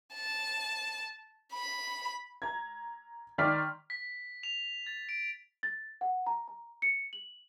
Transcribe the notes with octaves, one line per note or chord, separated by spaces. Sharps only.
A5
B5
A#5 G#6
D#3 D5 C6 F6 B6
B6
F7
A6
D7
A6
F#5
A#5
A#5
C#7
F#7